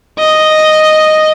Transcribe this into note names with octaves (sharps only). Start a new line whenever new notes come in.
D#5